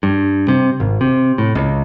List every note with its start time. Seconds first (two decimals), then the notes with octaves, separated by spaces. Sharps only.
0.03 G2
0.48 C3
0.80 G#1
1.01 C3
1.38 A2
1.55 C#2